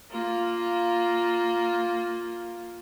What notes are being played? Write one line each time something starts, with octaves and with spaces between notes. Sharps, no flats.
A#3 F4